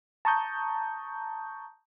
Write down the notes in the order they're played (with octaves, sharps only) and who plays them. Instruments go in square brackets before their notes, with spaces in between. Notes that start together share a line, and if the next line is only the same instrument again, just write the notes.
[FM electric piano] A5 A#5 C#6 D#6 G6